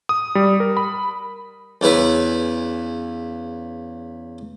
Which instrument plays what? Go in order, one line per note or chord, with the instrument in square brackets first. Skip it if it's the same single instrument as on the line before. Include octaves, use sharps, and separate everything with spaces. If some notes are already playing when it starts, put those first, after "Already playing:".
[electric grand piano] D#6
G3
A#4
B5
[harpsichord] E2 C#3 E4 B4